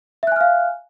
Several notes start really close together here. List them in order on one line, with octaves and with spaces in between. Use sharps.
E5 F#6 G#5 F6 F5